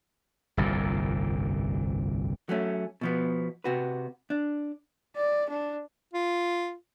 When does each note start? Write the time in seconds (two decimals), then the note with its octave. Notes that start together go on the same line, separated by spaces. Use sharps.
0.57 G1 C2 F2 A#2
2.49 F#3 A3 C#4
3.01 B2 F3 B3
3.64 C3 F#4 B4
4.30 D4
5.16 D5
5.50 D4
6.14 F4